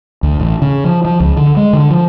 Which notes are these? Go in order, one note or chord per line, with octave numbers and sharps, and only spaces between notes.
D2
A1
C#3
F3
F3
C#2
D3
G#3
D3
F3